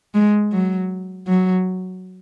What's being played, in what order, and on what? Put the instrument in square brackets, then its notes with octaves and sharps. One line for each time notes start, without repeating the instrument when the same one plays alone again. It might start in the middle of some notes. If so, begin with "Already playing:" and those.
[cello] G#3
F#3
F#3